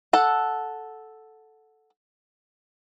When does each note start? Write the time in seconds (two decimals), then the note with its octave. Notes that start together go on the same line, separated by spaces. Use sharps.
0.13 A4 F#5